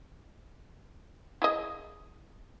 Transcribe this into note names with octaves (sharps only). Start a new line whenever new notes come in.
E4 G#4 D#5